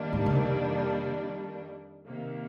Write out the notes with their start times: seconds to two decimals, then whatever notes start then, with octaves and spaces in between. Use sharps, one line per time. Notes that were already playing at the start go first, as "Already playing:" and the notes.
Already playing: F2 D#3 G3 A#3 D4
0.13 G#2
0.26 D3
0.32 C3
2.07 C3 D#3 A#3